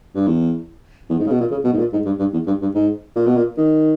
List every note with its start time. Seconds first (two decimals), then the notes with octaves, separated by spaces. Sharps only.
0.15 G2
0.27 E2
1.10 E2
1.19 G#2
1.26 C#3
1.30 B2
1.40 A#2
1.51 C#3
1.64 B2
1.73 G#2
1.79 A#2
1.93 G#2
2.06 G2
2.19 G2
2.33 E2
2.47 G2
2.62 G2
2.75 G#2
3.16 A#2
3.26 B2
3.36 A#2
3.57 D#3